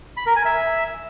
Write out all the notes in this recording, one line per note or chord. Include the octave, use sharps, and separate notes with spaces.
B5
A#4
G#5
E5